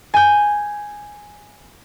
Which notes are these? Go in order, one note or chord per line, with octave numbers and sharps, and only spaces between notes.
G#5 G6